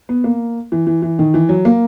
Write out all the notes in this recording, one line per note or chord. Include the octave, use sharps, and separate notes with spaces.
B3
A#3
E3
E3
E3
D#3
E3
F#3
A#3